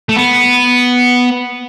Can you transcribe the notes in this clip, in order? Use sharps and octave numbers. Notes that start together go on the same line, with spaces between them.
A3
B3